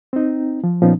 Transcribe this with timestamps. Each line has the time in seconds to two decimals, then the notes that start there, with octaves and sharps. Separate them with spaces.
0.13 C4 D#4
0.64 F3
0.82 A#2 F3 B3 C#4 D#4